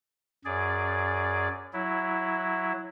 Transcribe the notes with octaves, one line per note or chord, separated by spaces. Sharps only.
F#2 G#4 D5
F#3 E4